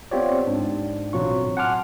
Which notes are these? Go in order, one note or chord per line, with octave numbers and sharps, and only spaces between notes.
B3 C4 F4 G4 C#5 D5
G#2 D4
A1 B2 F#3 C4 F4 C#6
F#5 G#5 A5 C6 D6 F6